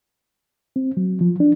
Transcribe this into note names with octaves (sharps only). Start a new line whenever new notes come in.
C4
F#3
F3
D4